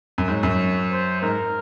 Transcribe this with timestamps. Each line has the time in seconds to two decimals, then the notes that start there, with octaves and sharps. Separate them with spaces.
0.18 F#2
0.28 G#2 C#5
0.43 F#2
0.90 C5
1.22 G#2 A#4